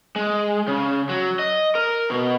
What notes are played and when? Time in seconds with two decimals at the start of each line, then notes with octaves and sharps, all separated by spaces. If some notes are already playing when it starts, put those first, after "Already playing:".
0.16 G#3
0.68 C#3
1.09 F#3
1.39 D#5
1.75 A#4
2.10 B2